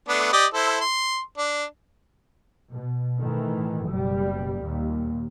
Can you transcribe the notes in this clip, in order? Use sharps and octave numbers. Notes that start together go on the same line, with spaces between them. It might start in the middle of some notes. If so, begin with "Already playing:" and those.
A3 B3 D4
G4 D5 D#5
E4 A4 C5
C6
D4
B2
A2 D#3 E3
F#1 B2 G3
D#2 A#2